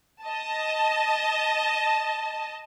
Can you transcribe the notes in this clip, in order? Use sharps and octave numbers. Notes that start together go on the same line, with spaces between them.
D#5 A5